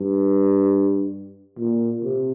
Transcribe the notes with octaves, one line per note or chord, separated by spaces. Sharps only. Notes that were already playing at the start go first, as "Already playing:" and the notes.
Already playing: G2
A#2
C3